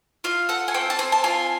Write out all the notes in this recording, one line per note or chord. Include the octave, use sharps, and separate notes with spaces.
F4 F5
A4 F#5
G#5
C4 G5
A5
C4 G#5
A5
F4 G#5